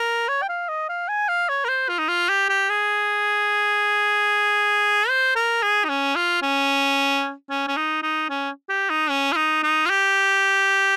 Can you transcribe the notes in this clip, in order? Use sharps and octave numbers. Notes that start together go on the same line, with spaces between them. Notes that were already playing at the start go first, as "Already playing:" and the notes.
Already playing: A#4
C#5
G5
F5
D#5
F5
G#5
F5
C#5
A#4
C5
F4
D#4
F4
G4
G4
G#4
C5
A#4
G#4
D#4
C#4
F4
C#4
C#4
C#4
D#4
D#4
C#4
G4
D#4
C#4
F4
D#4
D#4
F4
G4